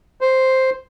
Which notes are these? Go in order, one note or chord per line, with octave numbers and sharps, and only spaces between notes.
C5